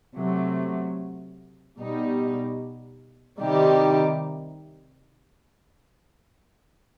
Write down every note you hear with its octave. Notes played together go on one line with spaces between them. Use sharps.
C3 F#3 A3
B2 G3 D#4
C3 D#3 G3 D#4 G4